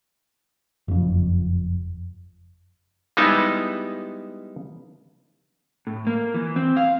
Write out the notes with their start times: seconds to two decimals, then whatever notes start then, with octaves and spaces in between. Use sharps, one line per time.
0.88 F#1 F2
3.17 G3 G#3 B3 D#4 E4 A5
5.87 A2
6.07 A#3
6.34 E3
6.56 C4
6.77 F5